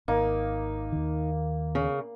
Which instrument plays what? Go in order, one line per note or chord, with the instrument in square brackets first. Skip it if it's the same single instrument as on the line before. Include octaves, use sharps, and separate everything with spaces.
[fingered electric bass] G#1 [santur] A#3 [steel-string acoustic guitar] D#4
[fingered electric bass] D#2 D#3
[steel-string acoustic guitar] C#3